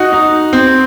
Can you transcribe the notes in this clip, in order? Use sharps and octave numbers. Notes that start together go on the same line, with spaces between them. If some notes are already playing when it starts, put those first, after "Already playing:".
Already playing: D#4 F#4
D#4
C4